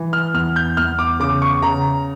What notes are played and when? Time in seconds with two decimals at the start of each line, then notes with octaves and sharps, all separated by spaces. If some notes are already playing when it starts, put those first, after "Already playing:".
Already playing: E3
0.13 F6
0.34 E2 F6
0.56 G6
0.77 E2 F6
0.99 D6
1.20 C#3 D6
1.42 C#6
1.62 C#3 A#5